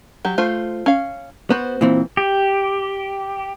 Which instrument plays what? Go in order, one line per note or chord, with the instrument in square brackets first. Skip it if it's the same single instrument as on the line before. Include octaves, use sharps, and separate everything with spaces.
[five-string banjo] F#3 G4
A3 F4 C5
C#4 F5
[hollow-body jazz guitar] B3 [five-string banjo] F#4 C5
[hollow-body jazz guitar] A#2 E3 C4
[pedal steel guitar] G4